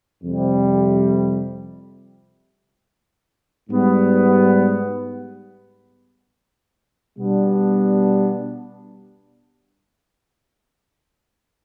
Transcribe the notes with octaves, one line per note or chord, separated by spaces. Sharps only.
F2 C3 G3
G#2 G3 B3
B2 G3 B3 D4